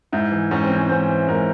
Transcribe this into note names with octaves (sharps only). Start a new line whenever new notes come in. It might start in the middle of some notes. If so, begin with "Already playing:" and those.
G#2 E4
E3
G#2 C#4
C4
E3
C#4
G#2 C5
E3
G#2 A#4